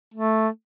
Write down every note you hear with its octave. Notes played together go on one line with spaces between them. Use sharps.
A3